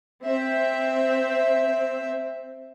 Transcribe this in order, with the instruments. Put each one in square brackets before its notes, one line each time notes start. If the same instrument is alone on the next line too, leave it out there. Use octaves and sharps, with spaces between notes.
[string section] C4 E5